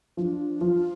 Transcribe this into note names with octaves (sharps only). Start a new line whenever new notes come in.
F3 D4 F4
F3 F4